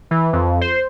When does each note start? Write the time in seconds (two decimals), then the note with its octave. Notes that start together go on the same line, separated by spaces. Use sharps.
0.11 E3
0.33 F2
0.61 C5